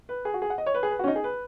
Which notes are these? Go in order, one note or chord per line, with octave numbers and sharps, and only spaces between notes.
B4
G#4
F#4
G#4
F#5
D#5
C#5
B4
G#4
B4
F#4
C#4
D#4
G#4
B4